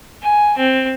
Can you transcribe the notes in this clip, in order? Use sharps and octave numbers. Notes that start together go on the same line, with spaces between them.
G#5
C4